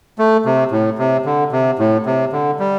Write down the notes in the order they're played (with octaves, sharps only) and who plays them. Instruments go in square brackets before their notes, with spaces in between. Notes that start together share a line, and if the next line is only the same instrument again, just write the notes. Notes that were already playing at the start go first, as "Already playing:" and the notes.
[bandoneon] A3
C3
A2
C3
D3
C3
A2
C3
D3
G3